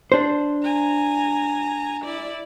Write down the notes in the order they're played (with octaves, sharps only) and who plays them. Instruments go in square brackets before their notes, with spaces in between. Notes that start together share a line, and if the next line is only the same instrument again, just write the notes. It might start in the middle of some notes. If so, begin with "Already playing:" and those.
[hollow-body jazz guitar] D4 C5
[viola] G#5 A#5
E4 D5